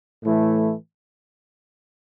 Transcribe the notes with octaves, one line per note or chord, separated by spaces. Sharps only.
A2 E3 A3 E4